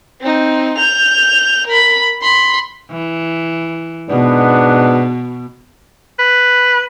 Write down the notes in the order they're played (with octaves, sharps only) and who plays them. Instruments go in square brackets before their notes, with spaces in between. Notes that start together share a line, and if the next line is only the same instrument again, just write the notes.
[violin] C4 D#4
G6 F7
A#4 B5
B5 C6
[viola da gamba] E3
[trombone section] G#2 B3 D4 [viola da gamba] B2
[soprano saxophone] B4